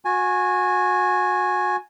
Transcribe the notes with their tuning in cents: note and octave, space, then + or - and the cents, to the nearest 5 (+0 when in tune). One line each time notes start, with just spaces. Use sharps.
F#4 -25 G#5 +0